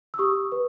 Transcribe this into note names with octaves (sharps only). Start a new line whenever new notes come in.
E6
G4 C#6 D#6
B4